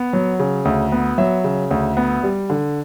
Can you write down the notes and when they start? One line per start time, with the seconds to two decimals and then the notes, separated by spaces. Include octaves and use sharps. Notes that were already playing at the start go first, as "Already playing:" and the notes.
Already playing: B3
0.13 F#3
0.39 C#3
0.65 D2
0.92 B3
1.18 F#3 E5
1.44 C#3
1.71 D2
1.97 B3
2.23 G3
2.50 D3